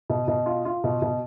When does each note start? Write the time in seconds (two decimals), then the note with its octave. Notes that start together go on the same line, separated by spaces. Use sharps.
0.10 B2
0.28 B2
0.46 F4
0.65 F4
0.84 B2
1.02 B2